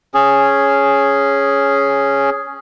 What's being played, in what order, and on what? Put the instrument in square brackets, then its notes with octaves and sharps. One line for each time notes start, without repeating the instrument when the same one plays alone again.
[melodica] C#4 G#4